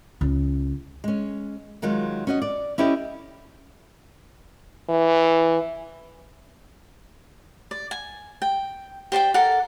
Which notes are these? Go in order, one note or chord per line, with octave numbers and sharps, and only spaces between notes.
C#2
G#3 C#4
D#3 F#3 G#3 F4
C#4 F#4 D#5
D5
C#4 E4 G4 A4 D#5
E3
D5
G#5
G5
G4 C5 D5 G5
A4 A#4 D5 F#5